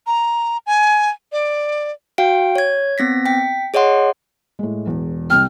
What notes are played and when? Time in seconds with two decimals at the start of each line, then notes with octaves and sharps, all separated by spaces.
0.06 A#5
0.66 G#5
1.32 D5
2.18 F#4 F5 G5 D7
2.56 C#5 G#6
2.98 B3 C4 A#6 B6
3.26 G5 B6
3.74 G#4 C#5 D#5 F#5 C6
4.59 A2 G#3
4.86 E1 E2
5.30 C2 C3 G5 F6